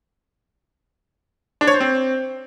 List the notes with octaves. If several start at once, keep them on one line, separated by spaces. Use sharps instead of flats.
D4
C#5
C5
C4